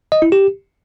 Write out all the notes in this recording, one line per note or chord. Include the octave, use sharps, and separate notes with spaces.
D#5
E4
G4